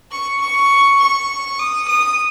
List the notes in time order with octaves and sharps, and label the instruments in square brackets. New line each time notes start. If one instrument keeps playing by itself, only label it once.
[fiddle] C#6
C#6
C#6
D#6
D#6